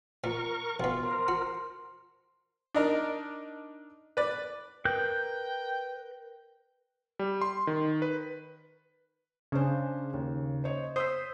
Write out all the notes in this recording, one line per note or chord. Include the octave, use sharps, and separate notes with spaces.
A#2 A#4 C#6
B1 B2 F4
A#4 C5
F#4
D4 D#4 A#4
B4 D5
A#4 B4 G5 F#6 G6
G3
C6
D#3
B4
C#3 C#4 D4 C5
D#2
C5 C#5 D#5
C5 D#6 E6 B6